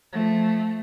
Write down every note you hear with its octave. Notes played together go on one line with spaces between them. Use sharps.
F3 A3